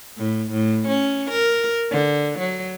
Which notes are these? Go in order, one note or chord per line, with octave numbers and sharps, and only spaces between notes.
A2
A2
C#4
A#4
D3
F#3